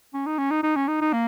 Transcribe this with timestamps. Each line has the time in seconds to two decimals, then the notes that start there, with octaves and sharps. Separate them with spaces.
0.14 C#4
0.26 D#4
0.38 C#4
0.51 D#4
0.63 D#4
0.76 C#4
0.88 D#4
1.01 D#4
1.13 A#3